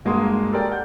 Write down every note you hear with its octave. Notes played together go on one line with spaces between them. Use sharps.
G2 G#3 A#3 F#4 C6 D#6
G4 A4 A#4 D5 G5
F#5 G6